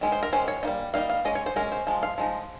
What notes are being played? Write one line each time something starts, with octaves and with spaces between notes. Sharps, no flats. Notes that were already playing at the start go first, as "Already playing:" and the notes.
D#3 G#3 C#4
C5
A#4
D#3 G#3 C#4 C5
C#5
G3 A#3 D#4
G3 A#3 D#4 F5
F5
G#3 C#4 D#5
C#5
C5
G#3 C#4 A#4
C5
F3 G#3
F5
F3 G#3 D#4